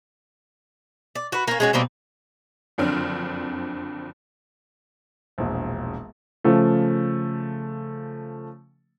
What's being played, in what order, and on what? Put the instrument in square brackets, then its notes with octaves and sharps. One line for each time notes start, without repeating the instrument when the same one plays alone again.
[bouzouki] D5
F#4 B4
A#3 C#4
G#3 C#4 F#4
B2 G3 A#3 C4
[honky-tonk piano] F#1 F2 D3 C4 D4 F6
[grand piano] E1 A#1
[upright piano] C#3 F3 A3